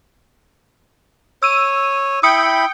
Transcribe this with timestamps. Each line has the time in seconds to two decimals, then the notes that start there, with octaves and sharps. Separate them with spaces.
1.43 C#5 E6 D#7
2.23 E4 G5 B5 D#6 E6 C#7